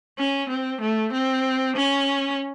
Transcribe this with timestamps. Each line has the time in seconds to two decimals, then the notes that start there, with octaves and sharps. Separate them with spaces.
0.18 C#4
0.49 C4
0.81 A3
1.13 C4
1.76 C#4